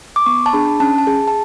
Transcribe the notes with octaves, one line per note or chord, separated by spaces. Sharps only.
D6
B3 C#6
A5
D4 G#4 B5
C#4 A5
A5
G#4
A5